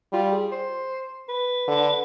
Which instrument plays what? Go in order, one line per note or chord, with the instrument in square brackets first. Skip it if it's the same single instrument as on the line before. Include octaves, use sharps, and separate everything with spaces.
[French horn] G3 [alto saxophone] F4
[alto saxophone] G#4
C5
B4
[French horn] D3